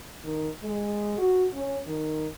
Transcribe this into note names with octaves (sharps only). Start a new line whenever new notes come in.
D#3
G#3
F#4
C#4
D#3